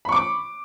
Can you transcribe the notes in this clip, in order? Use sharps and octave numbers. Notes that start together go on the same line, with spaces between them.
B5 C#6 D6